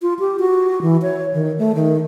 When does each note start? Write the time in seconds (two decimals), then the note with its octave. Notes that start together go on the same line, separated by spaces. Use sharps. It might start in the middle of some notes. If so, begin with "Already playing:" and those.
0.02 F4
0.19 G4
0.39 F#4
0.82 E3
1.02 C#5
1.33 D#3
1.58 A3
1.75 D#3